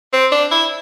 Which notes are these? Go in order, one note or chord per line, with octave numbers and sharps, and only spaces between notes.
C4
D4
E4